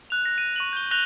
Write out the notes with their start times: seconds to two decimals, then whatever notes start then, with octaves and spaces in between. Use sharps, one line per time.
0.10 F#6 F7
0.25 A#6
0.38 D#7
0.56 C#6 D#7 F#7
0.73 G6 G7
0.91 F#6 A#6 F7 G7